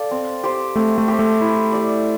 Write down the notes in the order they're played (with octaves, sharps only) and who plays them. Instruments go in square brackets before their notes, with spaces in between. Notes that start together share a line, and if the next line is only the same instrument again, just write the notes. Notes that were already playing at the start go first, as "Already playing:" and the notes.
Already playing: [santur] A4 D5 F5
C4
G4 C5
[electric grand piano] A3 [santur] C4
[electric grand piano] A3
[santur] G4 C5
[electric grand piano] A3
[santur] E4
G4 D5